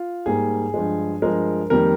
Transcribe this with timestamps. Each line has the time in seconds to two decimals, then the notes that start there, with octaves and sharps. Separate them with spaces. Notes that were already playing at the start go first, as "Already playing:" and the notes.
Already playing: F4
0.26 G#2 G3 A#3 G#4
0.74 G2 F3 G#3
1.22 G2 F3 G#3 A#4
1.70 F2 D#3 G3 A#3 A#4